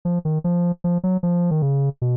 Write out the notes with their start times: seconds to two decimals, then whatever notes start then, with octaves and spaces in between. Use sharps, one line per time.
0.05 F3
0.25 D#3
0.44 F3
0.84 F3
1.04 F#3
1.23 F3
1.51 D#3
1.62 C#3
2.02 B2